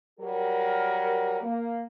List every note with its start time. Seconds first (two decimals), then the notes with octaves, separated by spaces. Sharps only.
0.19 F#3 G3 G4 A#4
1.41 A#3